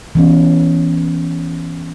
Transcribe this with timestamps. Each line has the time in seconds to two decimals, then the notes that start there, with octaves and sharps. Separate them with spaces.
0.15 E3 B3 C#4